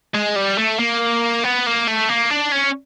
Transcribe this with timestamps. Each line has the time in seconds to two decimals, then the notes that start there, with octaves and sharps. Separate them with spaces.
0.14 G#3
0.36 G3
0.58 A3
0.79 A#3
1.44 B3
1.66 A#3
1.87 A3
2.09 A#3
2.30 D4
2.52 C#4